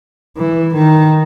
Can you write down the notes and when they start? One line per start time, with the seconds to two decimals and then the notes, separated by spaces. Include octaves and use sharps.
0.37 E3
0.74 D#3